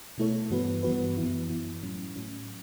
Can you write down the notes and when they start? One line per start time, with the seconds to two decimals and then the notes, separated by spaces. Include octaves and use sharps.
0.18 B2 A3 E4 A4 C#5
0.50 G2 E3 B3 F#4 B4
0.83 G2 E3 B3 F#4 B4
1.17 F#2 E3 B3 E4
1.49 F#2 E3 B3 E4
1.83 A2 F#3 C#4
2.15 A2 F#3 C#4